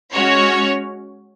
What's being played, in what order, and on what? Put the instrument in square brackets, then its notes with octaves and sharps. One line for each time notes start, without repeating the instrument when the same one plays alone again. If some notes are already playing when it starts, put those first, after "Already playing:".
[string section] G#3 C#4 F#4 C#5